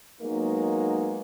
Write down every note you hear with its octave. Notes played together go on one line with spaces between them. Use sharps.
F#3 G#3 A#3 B3 D#4